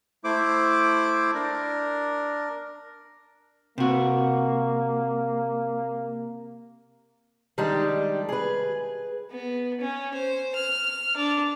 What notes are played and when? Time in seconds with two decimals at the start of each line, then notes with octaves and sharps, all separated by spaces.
0.24 A3 E4 C5 D6
1.34 D4 A#4
3.78 C3 A#3 F#4
7.58 D#3 G3 G#3 D4 G4
8.29 G#4 B4
9.31 B3
9.81 C#4
10.14 C5
10.55 F6
11.17 D4